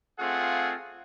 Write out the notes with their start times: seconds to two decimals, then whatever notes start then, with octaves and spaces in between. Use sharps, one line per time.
0.19 A3 C4 F4 G#4 F5 F#5